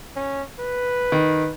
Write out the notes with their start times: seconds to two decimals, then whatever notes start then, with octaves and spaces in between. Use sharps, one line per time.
0.16 C#4
0.59 B4
1.12 D#3